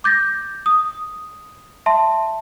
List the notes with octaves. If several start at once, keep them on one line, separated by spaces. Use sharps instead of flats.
D6 G6 A6 A#6
D#6
E5 A5 C6